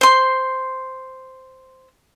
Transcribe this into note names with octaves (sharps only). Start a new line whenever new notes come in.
C5 C6